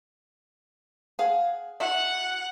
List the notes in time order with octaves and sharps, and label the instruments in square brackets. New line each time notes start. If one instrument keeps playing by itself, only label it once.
[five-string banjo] G#4 F5 F#5
[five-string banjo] E4 F#4 E5 [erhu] F#5